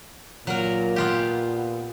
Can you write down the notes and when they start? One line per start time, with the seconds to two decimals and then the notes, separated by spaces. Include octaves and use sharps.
0.47 A#2 F#3 A#4
0.96 B3 F4 G4